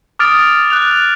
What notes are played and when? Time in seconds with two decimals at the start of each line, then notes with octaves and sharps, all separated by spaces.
0.19 D6 D#6 F6 A6 D7 F7
0.70 F#6 G6 F7